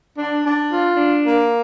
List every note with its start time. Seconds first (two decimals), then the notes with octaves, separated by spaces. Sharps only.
0.18 D4
0.44 D4
0.71 F4
0.97 D4
1.24 A#3